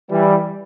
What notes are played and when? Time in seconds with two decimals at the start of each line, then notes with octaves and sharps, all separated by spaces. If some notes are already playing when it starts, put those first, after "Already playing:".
0.10 E3 G3